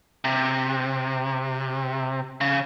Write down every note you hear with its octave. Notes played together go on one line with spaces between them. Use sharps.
C3
C#3